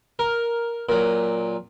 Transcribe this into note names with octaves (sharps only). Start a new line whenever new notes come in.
A#4
A#2 F#3